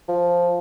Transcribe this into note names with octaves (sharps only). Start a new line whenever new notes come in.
F3